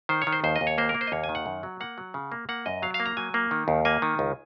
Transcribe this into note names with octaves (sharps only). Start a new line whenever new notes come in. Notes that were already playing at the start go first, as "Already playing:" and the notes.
D#3 C5
C#5
D#3
C5
D#2 C5
D#5
D#2
C#5
A#3 C5
A#4
A#3
C5
D#5
D#2 C#5
G#5
D#3
F#5
F#2
F#3
A#3 F#5
F#3
C#3
A#3
A#3 F#5
F#2 D#5
F#3 F5
F5
A#3
A#5
F#3 G#5
A#3
D#3
D#2
A#3 G#5
D#3
C#2